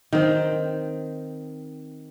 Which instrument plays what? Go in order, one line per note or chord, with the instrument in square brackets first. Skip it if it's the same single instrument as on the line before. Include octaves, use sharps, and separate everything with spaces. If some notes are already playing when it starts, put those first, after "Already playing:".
[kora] D#3 C4